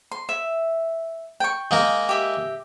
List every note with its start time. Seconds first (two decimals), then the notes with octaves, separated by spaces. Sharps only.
0.12 C6
0.29 E5
1.40 G5 C#6
1.71 G#3 A#3 A#4
2.09 G4 E5